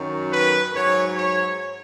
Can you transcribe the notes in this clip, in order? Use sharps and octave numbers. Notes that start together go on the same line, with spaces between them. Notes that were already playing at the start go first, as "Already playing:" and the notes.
Already playing: F#2 D#3 F#3
B4
G#2 F#3 C#5
C#5